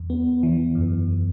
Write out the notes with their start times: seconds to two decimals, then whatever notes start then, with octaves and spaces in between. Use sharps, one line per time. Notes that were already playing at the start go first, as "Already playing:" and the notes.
Already playing: E2
0.10 B3
0.43 E3
0.75 F#2